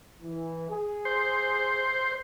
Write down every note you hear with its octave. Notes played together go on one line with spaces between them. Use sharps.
E3
G#4
C5